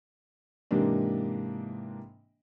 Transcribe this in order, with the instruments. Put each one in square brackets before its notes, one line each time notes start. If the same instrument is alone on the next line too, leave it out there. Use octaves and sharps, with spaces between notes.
[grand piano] G#2 C3 E3 A#3 D4